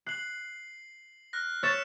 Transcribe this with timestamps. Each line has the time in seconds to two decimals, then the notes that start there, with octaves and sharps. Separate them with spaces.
0.07 F#6 C7 F#7
1.33 F6 F#6 A#6
1.63 C#5 E6 A6 B6 E7